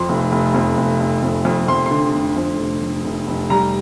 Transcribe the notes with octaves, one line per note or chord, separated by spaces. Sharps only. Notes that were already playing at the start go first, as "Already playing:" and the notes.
Already playing: F2 C6
F1
F1
F2
F1
F1
F2
F2
F2 C6
D3 C6
F1
F2
F1
F1
F1
F1
G3 A#5